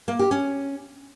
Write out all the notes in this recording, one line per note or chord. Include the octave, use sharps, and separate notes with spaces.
A#3
G4
C#4